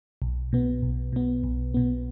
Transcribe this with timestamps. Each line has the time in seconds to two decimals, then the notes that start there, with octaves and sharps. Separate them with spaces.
0.22 B1
0.53 B2 B3
0.82 B1
1.13 B2 B3
1.44 B1
1.74 B2 B3